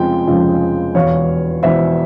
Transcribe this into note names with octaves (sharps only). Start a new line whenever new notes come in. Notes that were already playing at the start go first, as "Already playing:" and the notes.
Already playing: F1 F2 C#3 F3 G#3 G5
F1 F2 C#3 F3 G#3
E1 E2 E3 C#5 F5
E1 E2 E3 C5 E5